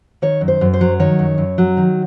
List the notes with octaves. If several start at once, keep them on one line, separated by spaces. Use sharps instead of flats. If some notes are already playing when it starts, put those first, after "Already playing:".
D#3 C#5
F#2
C5
F#2
C5
F#3
D#3 C#5
F#2
F#2
F#3
D#3